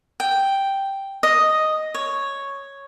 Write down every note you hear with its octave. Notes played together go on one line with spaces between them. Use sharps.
G5
D#5
C#5